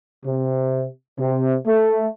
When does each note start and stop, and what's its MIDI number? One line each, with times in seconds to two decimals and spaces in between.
0.25 0.83 48
1.19 1.53 48
1.66 2.06 57